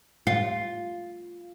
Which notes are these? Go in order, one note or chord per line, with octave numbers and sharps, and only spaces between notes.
F4